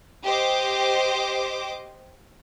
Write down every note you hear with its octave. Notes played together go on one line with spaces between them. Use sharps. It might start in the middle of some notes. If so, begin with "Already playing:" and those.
G4 C5 D#5 D6